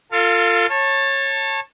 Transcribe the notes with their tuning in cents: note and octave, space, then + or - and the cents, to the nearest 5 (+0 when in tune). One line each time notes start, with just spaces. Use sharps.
F4 +0 A4 +40 F5 -15
C#5 -20 A5 +10